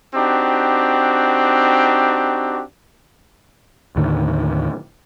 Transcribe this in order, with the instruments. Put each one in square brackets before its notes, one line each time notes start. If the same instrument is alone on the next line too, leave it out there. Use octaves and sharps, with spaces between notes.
[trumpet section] C4 D4 D#4 F#4 G4
[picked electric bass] D#2 A2 D3 D#3